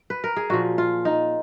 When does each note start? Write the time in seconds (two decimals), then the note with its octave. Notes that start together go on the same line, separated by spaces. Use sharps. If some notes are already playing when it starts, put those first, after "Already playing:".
Already playing: C#5
0.10 B4
0.24 A#4
0.36 G#4
0.50 A#2 F3 F#4
0.78 F4
1.05 D#4